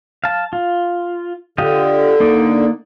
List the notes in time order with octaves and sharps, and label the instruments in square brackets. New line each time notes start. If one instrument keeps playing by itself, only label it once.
[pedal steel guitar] F5 A5
F4
[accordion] D3 [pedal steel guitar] F4 G4 D#5
[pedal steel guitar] A#3 D#4 D5